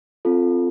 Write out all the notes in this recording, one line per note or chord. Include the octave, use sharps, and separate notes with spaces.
C4 F4 A4